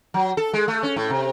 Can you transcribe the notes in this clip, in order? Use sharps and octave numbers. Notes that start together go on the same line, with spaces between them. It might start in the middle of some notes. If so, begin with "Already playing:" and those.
F#3
A4
G#3
A3
C#4
A2
C3